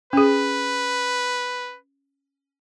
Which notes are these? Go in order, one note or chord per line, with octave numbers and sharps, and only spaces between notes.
C#4 G#4 B4